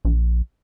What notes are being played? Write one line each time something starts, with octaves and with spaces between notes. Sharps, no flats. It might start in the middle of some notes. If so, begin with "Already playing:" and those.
A#1